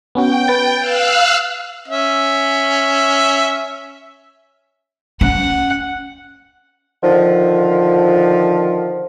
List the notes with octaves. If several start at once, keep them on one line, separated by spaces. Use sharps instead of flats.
B3 C#4 F#4 G5
B4 A6
F5 E6 F#6
C#4 E5
C#4 F#5
D3 D#3 F3